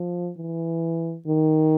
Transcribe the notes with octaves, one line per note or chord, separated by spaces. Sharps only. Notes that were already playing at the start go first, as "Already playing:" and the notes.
Already playing: F3
E3
D#3